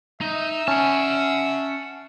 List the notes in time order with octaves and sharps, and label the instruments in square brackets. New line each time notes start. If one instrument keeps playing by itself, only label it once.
[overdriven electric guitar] D#4 [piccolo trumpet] E5
[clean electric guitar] C#4 [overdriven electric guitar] F#5 A5